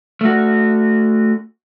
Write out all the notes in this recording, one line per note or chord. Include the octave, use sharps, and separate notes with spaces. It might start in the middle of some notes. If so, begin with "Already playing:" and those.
A3 F#4